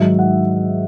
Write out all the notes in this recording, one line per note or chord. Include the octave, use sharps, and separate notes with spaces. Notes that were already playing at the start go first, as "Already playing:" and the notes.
Already playing: G#2 D#3 F#3 E5
F#5